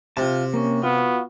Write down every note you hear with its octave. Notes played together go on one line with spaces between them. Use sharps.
C3 F4 A5
A#3 C#4
B3 F4 F#4